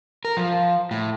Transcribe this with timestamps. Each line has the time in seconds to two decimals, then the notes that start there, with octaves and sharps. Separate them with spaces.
0.25 A#4
0.37 F3
0.91 A2